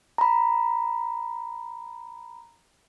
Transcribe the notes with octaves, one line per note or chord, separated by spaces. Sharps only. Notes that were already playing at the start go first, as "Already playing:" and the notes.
A#5 B5